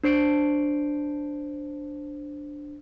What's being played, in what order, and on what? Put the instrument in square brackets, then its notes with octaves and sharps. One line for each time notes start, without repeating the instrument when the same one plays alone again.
[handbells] D4 C5 C7 D7